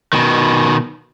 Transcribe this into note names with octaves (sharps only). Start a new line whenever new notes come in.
B2 D#3